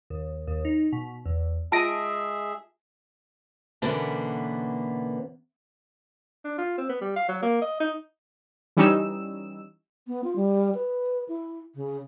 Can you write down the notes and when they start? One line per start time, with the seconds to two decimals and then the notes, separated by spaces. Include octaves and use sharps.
0.10 D#2
0.47 D#2
0.65 D#4
0.92 B2
1.26 E2
1.72 G#3 F4 G#4 E5 A5 A#6 D7 D#7
3.82 B2 D3 E3 A#3 B3 C#4
6.45 D4
6.58 F4
6.78 C4
6.89 B3
7.01 G3
7.16 F5
7.28 F#3
7.43 A#3
7.62 D#5
7.80 D#4
8.77 E3 G3 C#4 D#4 E6 E7
10.07 B3
10.24 F4
10.36 G3
10.74 B4
11.28 E4
11.75 C#3